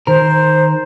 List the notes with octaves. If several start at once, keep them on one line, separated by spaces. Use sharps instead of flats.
D#3 A#4 C5